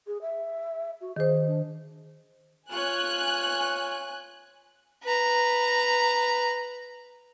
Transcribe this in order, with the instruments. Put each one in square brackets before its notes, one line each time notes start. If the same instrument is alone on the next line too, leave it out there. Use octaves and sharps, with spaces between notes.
[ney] G#4
E5
F#4
[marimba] D#3 C5 [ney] G#4
[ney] D4
[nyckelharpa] F4 C#5 [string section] G#5 F#6
[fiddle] B4 A#5